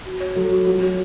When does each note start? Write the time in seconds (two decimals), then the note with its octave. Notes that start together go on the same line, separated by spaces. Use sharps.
0.06 F#4
0.20 C#5
0.36 F#3 A4
0.52 F#4
0.67 F#3 F4
0.83 C#5